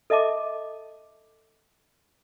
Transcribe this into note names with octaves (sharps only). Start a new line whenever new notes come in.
A4 D#5 E5 A5 D6